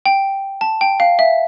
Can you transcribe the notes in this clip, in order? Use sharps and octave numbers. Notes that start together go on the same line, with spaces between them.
G5
A5
G5
F5
E5